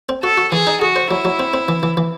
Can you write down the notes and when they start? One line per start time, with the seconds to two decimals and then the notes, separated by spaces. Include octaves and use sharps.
0.09 C4
0.23 F#4 A4
0.37 F#4
0.52 E3 G#4
0.67 D#4
0.81 F#4 G#4
0.96 C5
1.10 F#3 E4
1.25 F#3
1.39 C4
1.54 C4
1.68 E3
1.83 E3
1.97 E3